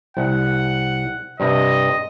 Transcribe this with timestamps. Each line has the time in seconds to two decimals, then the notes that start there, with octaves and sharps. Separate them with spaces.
0.17 C2 F#5
1.40 G2 C3 D#5